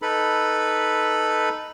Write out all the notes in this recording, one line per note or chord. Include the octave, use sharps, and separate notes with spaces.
D#4 A4 B4 B5